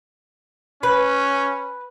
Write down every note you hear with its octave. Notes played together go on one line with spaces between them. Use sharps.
C#4 B4